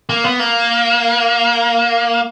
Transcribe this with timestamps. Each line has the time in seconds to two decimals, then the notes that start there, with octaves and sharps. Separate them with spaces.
0.09 A#3
0.24 B3
0.39 A#3